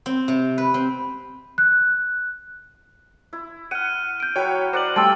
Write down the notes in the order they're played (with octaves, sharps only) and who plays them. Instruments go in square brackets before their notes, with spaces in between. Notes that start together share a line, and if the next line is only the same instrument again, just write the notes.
[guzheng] C4
C3
B4
C4
[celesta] F#6
[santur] E4
[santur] F#5 [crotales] F6 D#7
[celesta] G6 D7
[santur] F#3 B4 [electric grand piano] C#5 G5
[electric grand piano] C5 [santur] D5 F#5 A#5 [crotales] D6 F#7
[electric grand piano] G3 A3 [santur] G5 C6 [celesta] A5 E6 [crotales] F6 A6